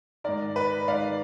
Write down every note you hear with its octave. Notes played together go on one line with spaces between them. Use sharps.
G#2 D#3 A#4 D5
B4
G#2 D#3 D5 F5